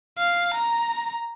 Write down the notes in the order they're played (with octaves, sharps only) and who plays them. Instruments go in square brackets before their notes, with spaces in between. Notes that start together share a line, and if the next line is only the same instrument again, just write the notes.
[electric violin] F5
A#5